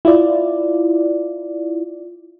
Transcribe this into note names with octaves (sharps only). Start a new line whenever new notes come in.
E4 F4 D5